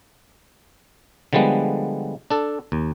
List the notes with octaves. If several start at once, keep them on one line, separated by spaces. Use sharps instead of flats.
D3 F3 G3 G#3 B3
D4 A4
D#2